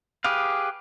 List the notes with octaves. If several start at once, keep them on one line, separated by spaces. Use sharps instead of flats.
G4 G#4 B4 F5